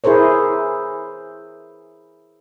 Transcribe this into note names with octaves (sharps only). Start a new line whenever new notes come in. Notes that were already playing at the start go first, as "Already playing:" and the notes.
E4 G#4 A#4 C5 C#5